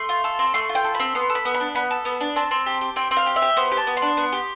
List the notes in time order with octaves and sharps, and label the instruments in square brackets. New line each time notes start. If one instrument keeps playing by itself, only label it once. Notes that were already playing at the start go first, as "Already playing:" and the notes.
Already playing: [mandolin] A3 C6
F4
A4
C4
A3 C6
F4
G5
A4
B5
C4
B3 C6
A4
B5
B3
B5
D4
B3 B5
A4
B3
D4
C4 A5
C4
G4
G4
C4 G5
C4
F5
G4
E5
G4
B3 C5
G4
A5
B3
D4 C6
B3
G4